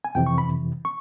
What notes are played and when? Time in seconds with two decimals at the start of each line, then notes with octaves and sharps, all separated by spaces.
0.04 G#5
0.15 F2 C3 E3 G5
0.27 C#6
0.38 B5
0.85 C#6